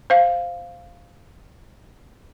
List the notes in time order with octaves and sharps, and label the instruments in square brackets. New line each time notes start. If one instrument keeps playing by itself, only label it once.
[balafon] C5 F5